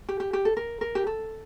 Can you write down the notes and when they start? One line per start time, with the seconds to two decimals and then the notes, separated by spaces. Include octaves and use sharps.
0.09 G4
0.20 G4
0.33 G4
0.45 A4
0.57 A#4
0.81 A#4
0.95 G4
1.07 A4